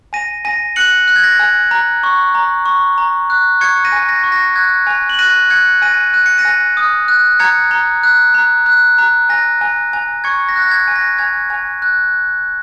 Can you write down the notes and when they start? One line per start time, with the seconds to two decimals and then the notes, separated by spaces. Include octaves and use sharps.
0.13 G#5 A#6 D#7
0.45 G#5 A#6 D#7
0.76 F#6 C#7 F#7
1.08 F#6
1.16 G#6
1.24 A#6
1.40 G#5
1.71 A#5
2.03 C#6
2.35 A#5
2.66 C#6
2.98 A#5
3.30 F#6
3.61 C#6 G#6 C#7
3.85 A#6 D#7
3.92 G#5
4.09 A#6
4.24 C#6
4.32 A#6
4.56 F#6 G#6
4.87 G#5
5.09 F#7
5.19 F#6 A#6 D#7
5.50 F#6 G#6 C#7
5.82 G#5 A#6 D#7
6.14 F#6 D#7
6.26 C#7
6.38 A#6 D#7
6.45 G#5
6.77 D#6
7.08 F#6
7.39 A#5 G#6 C#7
7.71 A#5
8.03 F#6
8.34 A#5
8.66 F#6
8.98 A#5
9.29 G#5 A#6
9.61 G#5
9.93 G#5
10.24 C#6 G#6 C#7
10.49 A#6
10.56 F#6
10.62 A#6
10.71 G#6
10.88 G#5
10.96 A#6
11.19 G#5 G#6
11.50 G#5
11.82 F#6